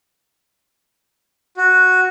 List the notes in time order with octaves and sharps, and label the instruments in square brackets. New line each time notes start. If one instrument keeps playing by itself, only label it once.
[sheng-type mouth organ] F#4